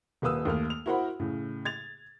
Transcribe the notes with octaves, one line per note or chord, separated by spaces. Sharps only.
D#1 A#3 B4 D#6 E6
D#2 A3 A#3 F6
F7
E4 F#4 A#4 C5 F#5 B5
A2 C#3
G#6 A6 F7